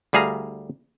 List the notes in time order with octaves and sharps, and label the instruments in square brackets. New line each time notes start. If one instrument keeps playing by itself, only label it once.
[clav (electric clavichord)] D2 G3 G#4 F5 A#5